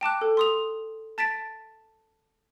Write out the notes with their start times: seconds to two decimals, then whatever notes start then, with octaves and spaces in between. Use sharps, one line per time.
0.01 G5 A5 D6 F#6
0.21 A4
0.37 C6 D#6 F7
1.18 A5 A6 B6 D7